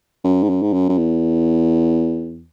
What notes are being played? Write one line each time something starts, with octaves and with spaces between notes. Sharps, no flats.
F#2
G#2
F#2
G#2
F#2
F#2
E2